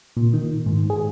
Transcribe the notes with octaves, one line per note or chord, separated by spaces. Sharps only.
A#2
D#3
G#2
G#4